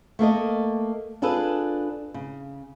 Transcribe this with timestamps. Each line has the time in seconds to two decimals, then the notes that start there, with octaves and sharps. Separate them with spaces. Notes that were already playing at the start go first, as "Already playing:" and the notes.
0.19 A3 A#3 A4 D#5
1.22 D4 F4 G#4 A4 B4
2.14 C#3